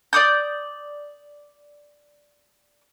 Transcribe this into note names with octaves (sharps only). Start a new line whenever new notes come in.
D5 D6 D#6 G6